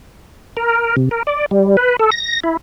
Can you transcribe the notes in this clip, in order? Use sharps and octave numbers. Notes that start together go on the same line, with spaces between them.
A#4
C3
A#4
D5
G3
B4
A4
A#6
E4